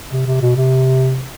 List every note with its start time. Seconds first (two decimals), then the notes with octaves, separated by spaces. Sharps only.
0.12 C3
0.27 C3
0.41 B2
0.57 C3